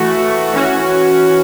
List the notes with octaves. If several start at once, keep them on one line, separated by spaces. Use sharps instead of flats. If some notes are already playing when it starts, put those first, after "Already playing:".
Already playing: E3 A3 F#4
E3 C#4 F#4